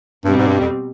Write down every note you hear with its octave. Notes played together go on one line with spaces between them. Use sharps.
G2 B2 G3 C4
G#2
G2
F2